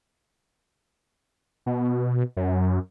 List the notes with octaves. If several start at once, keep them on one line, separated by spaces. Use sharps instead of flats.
B2
F#2